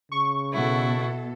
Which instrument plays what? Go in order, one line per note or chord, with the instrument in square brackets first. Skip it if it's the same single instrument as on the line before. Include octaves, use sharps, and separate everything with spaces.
[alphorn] C#3 [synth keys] C#6
[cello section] B2 A4 [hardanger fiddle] E4 F#5